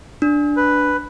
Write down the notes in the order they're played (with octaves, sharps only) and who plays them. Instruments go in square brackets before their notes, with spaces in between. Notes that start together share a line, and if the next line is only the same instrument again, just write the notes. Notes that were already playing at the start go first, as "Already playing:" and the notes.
[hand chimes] D4
[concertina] B4